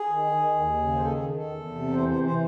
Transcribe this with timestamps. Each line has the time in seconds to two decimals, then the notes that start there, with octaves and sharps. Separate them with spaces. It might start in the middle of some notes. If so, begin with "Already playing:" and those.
Already playing: G#4
0.09 D#3
0.32 D#3
0.55 D#2
0.78 C#3
0.96 C5
1.01 D#3 A4
1.13 G#4
1.24 D#3
1.35 A4
1.47 E2
1.71 C3
1.93 E3 C5
2.09 C5
2.16 E3
2.24 C5